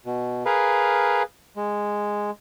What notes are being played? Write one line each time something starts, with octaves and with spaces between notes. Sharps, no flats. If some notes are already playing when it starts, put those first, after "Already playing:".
B2
G#4 A#4 B4 F5
G#3